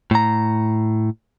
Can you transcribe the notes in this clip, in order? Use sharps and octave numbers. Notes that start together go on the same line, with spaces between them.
A2 A#5